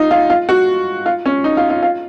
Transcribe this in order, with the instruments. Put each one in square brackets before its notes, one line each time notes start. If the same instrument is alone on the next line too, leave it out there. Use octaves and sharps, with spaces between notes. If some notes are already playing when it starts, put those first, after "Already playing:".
Already playing: [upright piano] D#4 F4
F4
F4
F#4
F4
C#4
D#4
F4
F4
F4